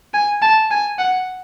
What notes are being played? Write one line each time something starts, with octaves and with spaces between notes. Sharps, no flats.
G#5
A5
G#5
F#5